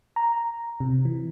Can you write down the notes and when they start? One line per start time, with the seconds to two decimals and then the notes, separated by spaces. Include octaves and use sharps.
0.16 A#5
0.80 C3
1.05 E3